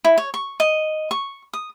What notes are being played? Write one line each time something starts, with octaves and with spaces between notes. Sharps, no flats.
E4
C#5
C#6
D#5
C#6
D#6